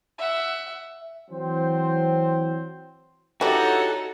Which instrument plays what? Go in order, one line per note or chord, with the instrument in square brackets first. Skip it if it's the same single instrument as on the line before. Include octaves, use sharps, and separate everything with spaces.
[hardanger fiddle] E5 F#5
[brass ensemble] E3 F#3 C4 C5
[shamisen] E3 G3 D4 [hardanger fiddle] D#4 [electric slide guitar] F#4 [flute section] G4 A4 C#5